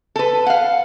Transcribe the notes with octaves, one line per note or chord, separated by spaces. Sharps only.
A4 B4
F5 F#5